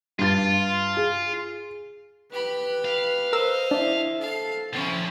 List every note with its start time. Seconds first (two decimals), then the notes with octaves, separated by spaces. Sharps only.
0.19 G2 F4 A6
0.97 G#4
2.32 G4 B4 B5
2.85 F5
3.33 A#4 C5 D#5 E6
3.71 D4 E4 E5
4.21 A4 F5
4.73 D3 F3 C4 C#4 E4